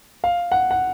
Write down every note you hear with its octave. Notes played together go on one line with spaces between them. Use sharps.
F5
F#5
F#5